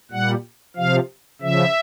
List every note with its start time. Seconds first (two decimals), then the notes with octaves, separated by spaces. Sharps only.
0.11 A#2 G3 F#5
0.76 C3 F3 F5
1.41 C#3 F3 E5